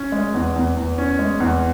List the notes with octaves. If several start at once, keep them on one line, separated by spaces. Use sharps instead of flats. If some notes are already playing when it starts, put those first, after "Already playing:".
Already playing: C#4
G#3
E2
E2
E2
C#4
G#3
E2